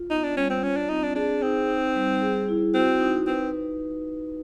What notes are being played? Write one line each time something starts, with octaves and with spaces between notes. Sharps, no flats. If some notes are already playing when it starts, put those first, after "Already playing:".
Already playing: F4
B3 D#4
D4
G3 C#4
C4
C#4 F4
D4
C4 D#4
D4
D4 G#4
C4 D#4
D#4
G3
G#4
E4
C4 F#4
D#4
C4 B4